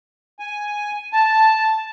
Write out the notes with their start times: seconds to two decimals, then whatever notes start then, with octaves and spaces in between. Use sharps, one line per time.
0.39 G#5
1.13 A5